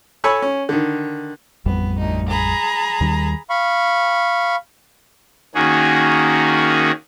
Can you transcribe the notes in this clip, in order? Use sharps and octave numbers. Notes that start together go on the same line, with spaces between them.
A4 C#5 G#5 B5 C#6 E6
C#4
D3 D#3
A1 F2 G3 B3
D2 D#4
G#4 A#5 B5
D#2 D#3 G3
F5 B5 C#6
D#3 A#3 C#4 F#4 G#4